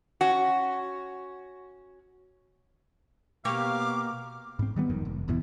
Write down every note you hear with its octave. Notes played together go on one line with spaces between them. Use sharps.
C#4 F#4
B2 A#3 G4 C#5 F5 D6
G#2 C4
D#3 G3 B3
F#1 F2 G#2 D#3
F1
G1 E2 B2 E3